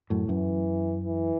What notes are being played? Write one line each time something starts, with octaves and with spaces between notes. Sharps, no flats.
F#2 A2
F#2 E3
E3